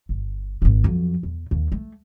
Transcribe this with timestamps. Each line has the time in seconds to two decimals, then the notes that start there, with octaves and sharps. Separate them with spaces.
0.09 G1
0.62 D#1 G#1
0.84 F2 F#3
1.23 E2
1.51 D#2
1.72 A3